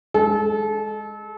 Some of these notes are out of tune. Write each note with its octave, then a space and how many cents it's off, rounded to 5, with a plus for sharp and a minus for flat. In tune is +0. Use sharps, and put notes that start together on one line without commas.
G#3 +0 A4 -30